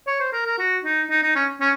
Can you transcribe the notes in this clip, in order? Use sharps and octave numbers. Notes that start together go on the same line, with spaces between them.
C#5
C5
A#4
A#4
F#4
D#4
D#4
D#4
C#4
C#4